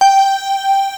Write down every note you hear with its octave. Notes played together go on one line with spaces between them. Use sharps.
G5